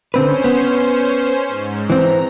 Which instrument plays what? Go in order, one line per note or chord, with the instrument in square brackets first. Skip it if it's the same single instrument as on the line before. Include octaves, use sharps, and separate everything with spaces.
[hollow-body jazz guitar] D3 C4 B4 [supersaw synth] C#4 C5
[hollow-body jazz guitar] B3
[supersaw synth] G#2
[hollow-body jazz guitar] E3 C4 [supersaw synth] A#5